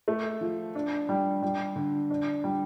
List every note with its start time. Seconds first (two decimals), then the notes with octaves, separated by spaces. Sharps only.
0.08 A3
0.41 F3
0.75 D4
1.09 G3
1.42 G3
1.76 D3
2.10 D4
2.44 G3